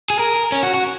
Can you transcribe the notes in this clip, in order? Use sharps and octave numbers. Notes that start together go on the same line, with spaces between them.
G#4
A#4
C#4
F#4
F#4